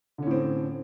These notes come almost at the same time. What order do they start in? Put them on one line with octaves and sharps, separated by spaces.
D3 C#4 A2 C4